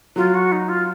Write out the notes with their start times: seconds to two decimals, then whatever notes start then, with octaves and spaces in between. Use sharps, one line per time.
0.16 F#3 F4
0.34 F#4
0.52 D#4
0.69 F4